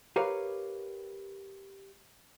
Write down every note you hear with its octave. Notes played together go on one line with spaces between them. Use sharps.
G4 A#4 B4 C#5 F5